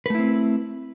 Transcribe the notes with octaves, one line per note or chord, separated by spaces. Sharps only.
A3 C4 E4 B4